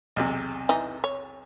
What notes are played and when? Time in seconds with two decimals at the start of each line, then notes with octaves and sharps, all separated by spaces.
0.16 B1 E2 C3
0.69 E3 D#4
1.04 C#5